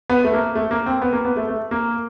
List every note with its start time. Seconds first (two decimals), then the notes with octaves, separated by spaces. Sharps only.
0.10 B3
0.24 A3
0.34 A#3
0.55 A3
0.71 A#3
0.86 C4
1.02 B3
1.13 A#3
1.25 B3
1.37 A3
1.48 A3
1.71 A#3